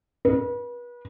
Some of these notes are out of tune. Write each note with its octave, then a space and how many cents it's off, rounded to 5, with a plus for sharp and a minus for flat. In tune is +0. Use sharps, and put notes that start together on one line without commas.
B4 -35